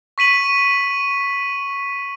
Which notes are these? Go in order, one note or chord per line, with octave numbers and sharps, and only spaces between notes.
C#6 B6 D#7 F#7